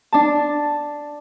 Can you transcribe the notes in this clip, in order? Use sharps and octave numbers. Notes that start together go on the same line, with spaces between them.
D4 A5